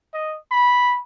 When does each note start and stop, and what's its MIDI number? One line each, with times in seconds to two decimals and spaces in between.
0.14 0.36 75
0.51 0.98 83